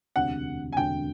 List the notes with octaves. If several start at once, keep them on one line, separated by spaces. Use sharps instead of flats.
E1 D2 C3 F#5
G#5
E1 D2 C3 G5